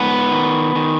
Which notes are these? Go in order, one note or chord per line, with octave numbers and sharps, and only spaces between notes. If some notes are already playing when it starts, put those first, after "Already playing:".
Already playing: G#2 B3
D#3
D#3